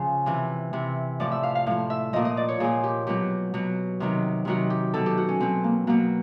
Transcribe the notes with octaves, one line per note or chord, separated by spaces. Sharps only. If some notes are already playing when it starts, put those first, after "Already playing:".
Already playing: C#3 F3
C3 E3
C3 E3
A2 F3 D5
E5
F5
F5
A2 F3 F5
E5
A#2 F3 D#5
D#5
D5
C#5
A#2 F3 G#4
G4
B2 F#3 G4
B2 F#3
C3 D#3 F#3
C3 D#3 F#3 F#4
G4
B2 F#3 A4
G4
F#4
C#4
B2 F#3 C4
A#3
B2 F#3 A#3